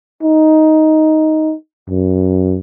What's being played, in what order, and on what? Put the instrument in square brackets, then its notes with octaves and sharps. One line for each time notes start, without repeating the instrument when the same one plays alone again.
[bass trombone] D#4
F#2